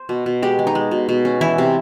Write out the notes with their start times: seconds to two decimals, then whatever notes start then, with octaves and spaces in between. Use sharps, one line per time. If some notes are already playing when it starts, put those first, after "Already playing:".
Already playing: C5
0.09 B2
0.26 B2
0.42 G#3 G4
0.59 G#3
0.67 D#4
0.75 G#3
0.91 B2
1.09 B2
1.25 C#4
1.41 E3 E4
1.58 C3